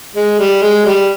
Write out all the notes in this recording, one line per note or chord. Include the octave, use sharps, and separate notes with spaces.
G#3
G3
G#3
G3